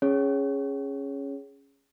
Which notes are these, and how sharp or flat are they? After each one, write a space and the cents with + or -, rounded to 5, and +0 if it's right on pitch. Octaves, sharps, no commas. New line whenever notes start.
C#4 +0 G#4 +0 C#5 +0